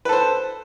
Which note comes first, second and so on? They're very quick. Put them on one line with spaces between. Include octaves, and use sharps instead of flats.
B4 A4 C5